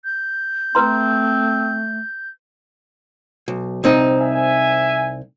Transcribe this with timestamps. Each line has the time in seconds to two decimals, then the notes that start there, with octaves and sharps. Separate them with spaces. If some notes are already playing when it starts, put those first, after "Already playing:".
0.05 G6
0.75 A3 C4 B4 A#5 C6
3.48 B1
3.84 C2 C4 D#4
4.20 E5 G#5